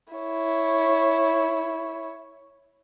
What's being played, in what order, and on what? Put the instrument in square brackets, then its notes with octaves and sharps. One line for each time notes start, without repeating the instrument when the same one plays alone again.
[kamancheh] E4 C#5